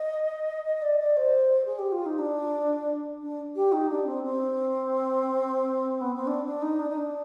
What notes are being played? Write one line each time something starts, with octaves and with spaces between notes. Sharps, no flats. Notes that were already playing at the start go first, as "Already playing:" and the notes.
Already playing: D#5
D#5
D5
D5
C5
G#4
G4
F4
D#4
D4
D4
G4
D#4
D4
C4
C4
B3
C4
D4
D4
D#4
D4
D#4
D4